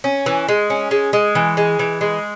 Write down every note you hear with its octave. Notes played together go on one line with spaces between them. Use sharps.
C#4
E3
G#3
C#4
G#3
G#3
E3
G#3
E3
G#3